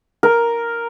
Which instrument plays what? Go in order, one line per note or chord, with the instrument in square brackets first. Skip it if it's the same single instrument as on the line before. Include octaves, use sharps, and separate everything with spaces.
[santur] A#4